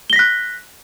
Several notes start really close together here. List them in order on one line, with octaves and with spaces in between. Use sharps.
G7 A#6 B6 F#6